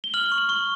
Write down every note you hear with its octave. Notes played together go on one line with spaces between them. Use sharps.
G7
F6 F#7
F#7
C#6
F#7
C#6 G7